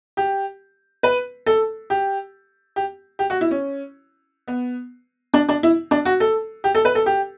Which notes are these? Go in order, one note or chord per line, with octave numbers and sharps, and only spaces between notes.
G4
B4
A4
G4
G4
G4
F#4
E4
C#4
B3
D4
D4
E4
D4
F#4
A4
G4
A4
B4
A4
G4